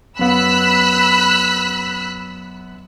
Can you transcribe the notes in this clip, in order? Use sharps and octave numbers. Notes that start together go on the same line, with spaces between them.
F#2 B3 B5 E6 F#6